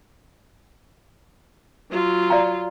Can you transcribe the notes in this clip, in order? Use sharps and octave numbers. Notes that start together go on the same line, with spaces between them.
F#3 F4
D5 F5 A#5